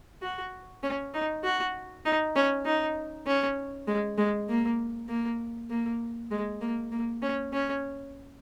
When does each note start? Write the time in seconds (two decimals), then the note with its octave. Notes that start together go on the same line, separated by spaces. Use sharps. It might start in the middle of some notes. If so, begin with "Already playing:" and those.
0.22 F#4
0.83 C#4
1.14 D#4
1.44 F#4
2.05 D#4
2.36 C#4
2.66 D#4
3.27 C#4
3.88 G#3
4.18 G#3
4.49 A#3
5.09 A#3
5.70 A#3
6.31 G#3
6.61 A#3
6.92 A#3
7.22 C#4
7.53 C#4